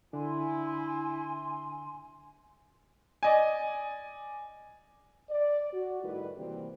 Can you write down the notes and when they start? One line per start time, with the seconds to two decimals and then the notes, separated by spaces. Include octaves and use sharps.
0.13 D3 D4 E4 G#5 C6
3.23 D5 D#5 G#5
5.29 D5
5.72 F#4
6.03 A2 D#3 G3 E4 B4
6.36 C3 E3 G3 A#3 C4 G4